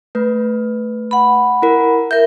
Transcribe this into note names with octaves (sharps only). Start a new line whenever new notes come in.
A3 B4
F#5 B5
E4 A#4
A#4 E5 G6